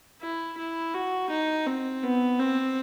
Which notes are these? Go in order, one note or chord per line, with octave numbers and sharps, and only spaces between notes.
E4
E4
F#4
D#4
C4
B3
C4